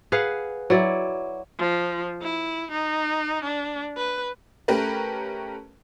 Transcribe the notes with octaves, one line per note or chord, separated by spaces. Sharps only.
G#4 B4 F5 F#5
F#3 E4 D5
F3
E4
D#4
D4
B4
A3 C#4 G4 A#4 B4